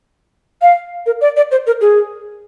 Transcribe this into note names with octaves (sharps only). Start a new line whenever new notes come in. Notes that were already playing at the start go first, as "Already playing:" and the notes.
F5
A#4
D5
D5
C5
A#4
G#4